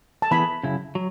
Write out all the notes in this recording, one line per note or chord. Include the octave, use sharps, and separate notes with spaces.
A5
E3 B3 E4 G#4 B4 B5
F#2 C#3 E4
F#3